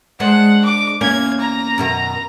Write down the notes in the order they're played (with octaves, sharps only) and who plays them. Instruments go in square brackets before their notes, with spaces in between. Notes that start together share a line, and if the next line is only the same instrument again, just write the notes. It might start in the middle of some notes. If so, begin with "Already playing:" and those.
[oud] G#3 D4 C5 [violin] F#5
[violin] D6
[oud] E2 A#3 C#4 [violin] G#6
[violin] A#5
[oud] F#2 B2 D#3